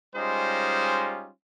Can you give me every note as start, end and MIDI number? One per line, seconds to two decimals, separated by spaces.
0.15 1.29 55
0.15 1.29 56
0.15 1.29 61
0.15 1.29 63
0.15 1.29 65
0.15 1.29 72